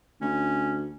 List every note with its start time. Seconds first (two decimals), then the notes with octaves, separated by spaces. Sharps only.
0.21 D2 C#4